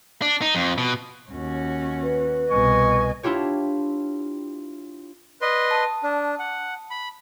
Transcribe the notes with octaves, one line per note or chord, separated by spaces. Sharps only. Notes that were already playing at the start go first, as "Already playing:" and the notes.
D4
D#4
F2
B2
D#2 C#4 F#4
B4
C2 B2 D#5 G#5 C#6
D4 E4 F4 G4 C#5
B4 D5 D#5 C6
A5 D#6
D4
F#5
B5